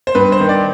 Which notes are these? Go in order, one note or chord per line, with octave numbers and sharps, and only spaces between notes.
C5
G2 B4
C5
D#3
D5